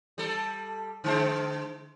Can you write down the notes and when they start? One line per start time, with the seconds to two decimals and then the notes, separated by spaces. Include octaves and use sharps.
0.18 G3 A4
1.04 D3 G#3 C5